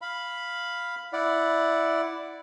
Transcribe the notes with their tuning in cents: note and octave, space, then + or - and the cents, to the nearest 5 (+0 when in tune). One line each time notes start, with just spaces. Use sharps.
F5 +0 B5 +0
E4 +0 D5 +0 F#5 +0